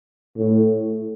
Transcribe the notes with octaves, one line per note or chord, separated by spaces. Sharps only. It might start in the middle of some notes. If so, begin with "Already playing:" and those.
A2